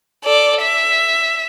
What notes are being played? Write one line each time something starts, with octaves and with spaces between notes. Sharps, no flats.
A4 D5
E5